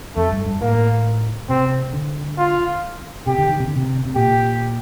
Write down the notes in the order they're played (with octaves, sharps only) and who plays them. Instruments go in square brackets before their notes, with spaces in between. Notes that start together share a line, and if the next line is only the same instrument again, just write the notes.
[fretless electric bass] F2 [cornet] A3
[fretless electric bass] G2
G2
[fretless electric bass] A2 [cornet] A#3
[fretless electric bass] C3 [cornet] C4
[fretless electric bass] D3
[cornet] F4
[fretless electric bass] C3 [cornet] G4
[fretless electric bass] D3
D#3
C3
D3
C3
C3
[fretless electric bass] A#2 [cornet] G4